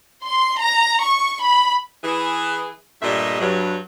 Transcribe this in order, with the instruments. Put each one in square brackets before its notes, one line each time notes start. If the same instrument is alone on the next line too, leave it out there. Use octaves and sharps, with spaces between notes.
[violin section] C6
A#5
C#6
B5
[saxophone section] E3 G#4
G2 A#2 G3 A3 D#5 E5
G2 F#3